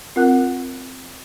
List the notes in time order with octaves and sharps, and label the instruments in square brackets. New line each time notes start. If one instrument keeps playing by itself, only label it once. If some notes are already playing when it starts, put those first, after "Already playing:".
[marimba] C4 F4 A#4 F#5 F#6